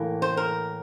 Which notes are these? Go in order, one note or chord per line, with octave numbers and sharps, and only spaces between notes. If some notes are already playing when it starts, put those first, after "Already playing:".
Already playing: A2 E3 A#3
C5
A#4